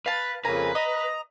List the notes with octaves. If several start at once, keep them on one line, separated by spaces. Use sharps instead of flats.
B4 F5 A5
F2 C#3 A#3 B4 G#5 A#5
D#5 A#5